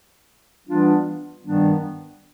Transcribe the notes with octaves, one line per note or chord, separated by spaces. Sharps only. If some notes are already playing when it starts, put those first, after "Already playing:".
E3 G3 B3 D4 F4
G2 D#3 G3 B3 D4